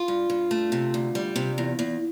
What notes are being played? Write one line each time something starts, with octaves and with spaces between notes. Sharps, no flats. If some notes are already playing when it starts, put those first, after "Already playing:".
Already playing: F4
G2
G2
A3
C3
D2
G3
C3
E2
E2